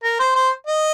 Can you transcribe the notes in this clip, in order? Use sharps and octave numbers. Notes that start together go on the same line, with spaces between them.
A#4
C5
C5
D#5